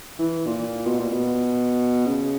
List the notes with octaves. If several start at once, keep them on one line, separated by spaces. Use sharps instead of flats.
E3
A#2
B2
A#2
B2
C#3